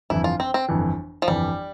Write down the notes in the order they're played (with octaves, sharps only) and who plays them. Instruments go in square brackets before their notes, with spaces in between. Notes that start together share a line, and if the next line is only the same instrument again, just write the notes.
[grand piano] G1 F2 E3 [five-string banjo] E4
[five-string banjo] F4
C4
C4
[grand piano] G1 F2 E3
[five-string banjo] F3
[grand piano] G1 F2 E3 [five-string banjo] G3